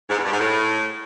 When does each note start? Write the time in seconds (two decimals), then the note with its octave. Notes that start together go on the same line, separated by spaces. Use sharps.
0.10 G#2
0.17 E2
0.24 G2
0.32 G#2
0.39 A2